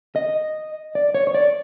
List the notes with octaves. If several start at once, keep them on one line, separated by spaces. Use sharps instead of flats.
D#5
D5
C#5
C#5
D5